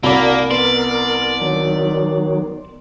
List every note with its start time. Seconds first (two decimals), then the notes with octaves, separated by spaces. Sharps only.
0.03 C2 A#3 F#4 A#4 D5 B5
0.51 B3 A#4 D5 C6
1.41 D#3 F#3